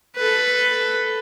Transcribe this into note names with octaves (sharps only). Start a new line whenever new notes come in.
A4 B4